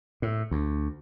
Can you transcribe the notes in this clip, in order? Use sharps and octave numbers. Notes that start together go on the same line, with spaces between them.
A2
D2